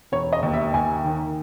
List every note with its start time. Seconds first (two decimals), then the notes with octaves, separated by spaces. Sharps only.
0.12 E1 C#5
0.33 D#5
0.43 D#2
0.53 E5
0.74 D#2 G#5
1.05 D#3